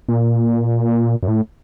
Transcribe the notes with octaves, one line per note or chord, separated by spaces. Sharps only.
A#2
F#2
A2